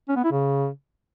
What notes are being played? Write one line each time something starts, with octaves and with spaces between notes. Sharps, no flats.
C#4
B3
E4
C#3